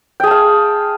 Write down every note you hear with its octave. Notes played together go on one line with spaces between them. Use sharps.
G#4 F5 G5 A5